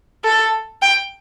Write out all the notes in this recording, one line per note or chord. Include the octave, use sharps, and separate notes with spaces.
A4
G5